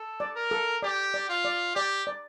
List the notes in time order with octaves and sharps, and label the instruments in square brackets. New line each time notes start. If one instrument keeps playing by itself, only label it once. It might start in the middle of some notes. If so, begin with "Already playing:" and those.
Already playing: [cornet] A4
[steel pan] D5
[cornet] A#4
[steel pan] A4
[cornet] G4 [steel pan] D5
[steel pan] D5
[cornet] F4
[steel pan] D5
[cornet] G4 [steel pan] D5
[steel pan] D5